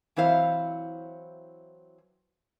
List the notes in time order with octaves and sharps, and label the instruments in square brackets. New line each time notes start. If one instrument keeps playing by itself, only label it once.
[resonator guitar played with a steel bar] E3 F#3 C4 E4 C5 F5